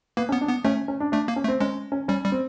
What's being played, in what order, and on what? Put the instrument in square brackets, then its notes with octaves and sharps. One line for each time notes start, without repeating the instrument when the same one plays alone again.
[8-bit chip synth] A#3 [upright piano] B3
[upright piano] C#4
[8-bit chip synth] B3
[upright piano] D4
[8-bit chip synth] B3
[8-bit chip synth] A3 [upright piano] C#4
[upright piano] C#4
D4
[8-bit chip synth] A3 [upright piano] D4
[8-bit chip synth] A#3
[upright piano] C#4
[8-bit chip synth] A3
[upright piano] C4
[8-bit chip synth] G#3 [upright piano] C#4
[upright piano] C#4
[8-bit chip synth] G3 [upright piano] C#4
[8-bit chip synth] G3
[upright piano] C4